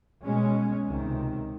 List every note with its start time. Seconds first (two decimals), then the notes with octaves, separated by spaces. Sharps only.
0.24 B2 G#3 C#4
0.86 C#2 C3 D#3